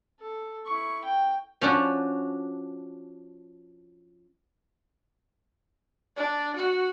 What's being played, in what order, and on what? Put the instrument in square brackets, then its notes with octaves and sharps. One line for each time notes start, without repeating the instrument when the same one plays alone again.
[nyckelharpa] A4
E4 C#6
G5
[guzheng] F3 C#4 D4 F#4
[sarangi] D4
F#4